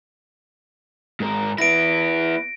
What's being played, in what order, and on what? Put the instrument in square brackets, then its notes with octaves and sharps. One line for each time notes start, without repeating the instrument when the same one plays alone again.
[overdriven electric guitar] G#2 A#4
[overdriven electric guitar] B3 E4 [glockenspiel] A#6 D7